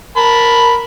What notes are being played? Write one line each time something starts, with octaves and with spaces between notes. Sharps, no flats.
A#4 A5 B5